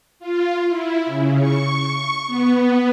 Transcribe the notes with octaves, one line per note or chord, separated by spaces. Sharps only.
F4
E4
C#3
C#6
B3